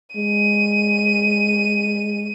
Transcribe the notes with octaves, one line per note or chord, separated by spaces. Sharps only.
G#3 D#7